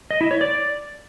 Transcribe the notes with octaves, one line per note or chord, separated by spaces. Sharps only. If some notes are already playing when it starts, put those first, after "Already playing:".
D#5
E4
C#5
D5